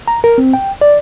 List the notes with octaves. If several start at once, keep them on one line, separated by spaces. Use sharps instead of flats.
A#5
A#4
C4
G5
D5